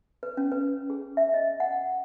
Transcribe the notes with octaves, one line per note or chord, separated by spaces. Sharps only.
B4
C#4
B4
G#4
E5
D#5
F#5